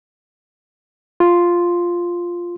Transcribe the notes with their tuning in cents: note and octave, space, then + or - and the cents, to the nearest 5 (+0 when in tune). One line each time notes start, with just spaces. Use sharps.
F4 +0 C6 +0